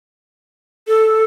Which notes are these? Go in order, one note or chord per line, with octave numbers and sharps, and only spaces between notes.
A4